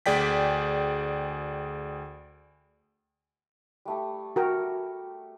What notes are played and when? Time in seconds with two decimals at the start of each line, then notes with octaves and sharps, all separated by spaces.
0.06 D2 G#4 D5 G5 B6
3.85 G3 A3 G4
4.36 F#4 A#4 G5